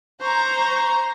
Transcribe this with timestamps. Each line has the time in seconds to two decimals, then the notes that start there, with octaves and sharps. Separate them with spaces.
0.21 C5 A#5 C#6